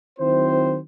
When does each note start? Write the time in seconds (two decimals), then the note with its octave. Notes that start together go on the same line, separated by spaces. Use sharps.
0.19 D#3 F#3 C4 E4 C5